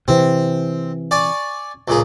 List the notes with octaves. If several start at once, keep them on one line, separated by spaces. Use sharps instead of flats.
C3 E3 C4
D5 G#5 C#6
C#2 A#2 G#4